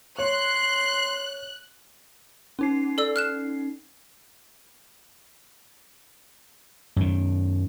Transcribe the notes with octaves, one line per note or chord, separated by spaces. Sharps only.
C#5 C6 F#6
C#4 D#4 C7
A4 D5 E6
F6 F#6 E7
F#2 D#3